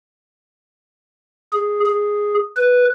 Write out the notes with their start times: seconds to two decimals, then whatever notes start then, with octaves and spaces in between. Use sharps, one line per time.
1.53 G#4
1.86 G#4
2.57 B4